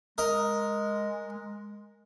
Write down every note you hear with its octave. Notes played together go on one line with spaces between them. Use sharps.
G#3 A#4 D#5